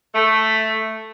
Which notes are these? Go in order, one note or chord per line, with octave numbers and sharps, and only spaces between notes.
A3